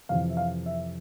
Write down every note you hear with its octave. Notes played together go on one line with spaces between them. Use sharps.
F2 C3 E3 F5
E5
F5
E5